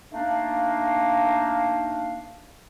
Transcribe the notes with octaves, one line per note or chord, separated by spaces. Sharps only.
A3 A#3 D4 D#4 F5